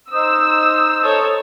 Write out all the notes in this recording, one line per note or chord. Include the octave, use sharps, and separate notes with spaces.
D#4 C5 D#6 E6
A4 C#5